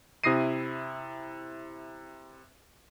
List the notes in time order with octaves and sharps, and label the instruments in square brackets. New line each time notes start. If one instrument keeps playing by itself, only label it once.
[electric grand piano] C3 E4 D#6 A#6 C7 D#7